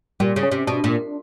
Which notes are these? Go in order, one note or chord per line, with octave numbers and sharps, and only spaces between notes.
A#2 G3
C#3
C#4
C3
B2 D4
A#2